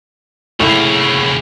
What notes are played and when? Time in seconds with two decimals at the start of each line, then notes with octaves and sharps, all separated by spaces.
0.60 C2 A2 C#3